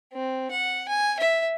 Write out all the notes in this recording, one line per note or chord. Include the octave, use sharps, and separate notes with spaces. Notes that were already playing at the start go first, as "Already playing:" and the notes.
C4
F#5
G#5
E5